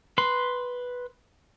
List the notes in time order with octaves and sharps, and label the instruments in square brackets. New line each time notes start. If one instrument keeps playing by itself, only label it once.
[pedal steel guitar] B4 B5 C6